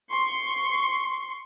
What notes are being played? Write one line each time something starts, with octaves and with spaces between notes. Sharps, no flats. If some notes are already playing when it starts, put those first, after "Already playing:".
C6 C#6